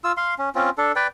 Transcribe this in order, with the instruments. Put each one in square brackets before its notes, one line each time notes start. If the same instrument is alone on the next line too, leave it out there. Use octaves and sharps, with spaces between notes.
[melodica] F4 E6
F5 C6
C#4
C4 C#4 F4
D4 A4
B4 D5 G5